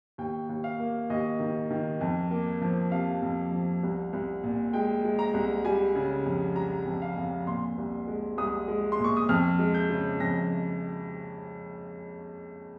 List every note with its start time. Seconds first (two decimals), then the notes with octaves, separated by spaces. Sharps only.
0.18 D#2 G5
0.49 D#2
0.64 F5
0.79 A#3
1.10 D#2 D#5
1.40 D#3
1.70 D#3
2.01 F2
2.31 A#3
2.62 F3
2.92 C3 F5
3.22 F2
3.52 F3
3.83 C2
4.13 C2
4.44 A#2
4.73 G#3 G5
5.04 G#3
5.19 A#5
5.34 C2
5.65 G3 G#5
5.95 C#3
6.26 F2
6.56 G3 A#5
6.86 F2
7.02 F5
7.17 F2
7.47 A#2 C6
7.78 C2
8.07 G#3
8.38 C2 D#6
8.68 G#3
8.92 C6
8.99 A#2
9.04 C#6
9.17 D#6
9.29 F2 F6
9.59 G#3
9.74 G6
9.90 C#3
10.20 F2 A#6